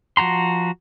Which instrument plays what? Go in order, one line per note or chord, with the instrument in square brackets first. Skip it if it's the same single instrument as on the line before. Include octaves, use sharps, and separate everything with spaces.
[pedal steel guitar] F3 F#4 A#5 C6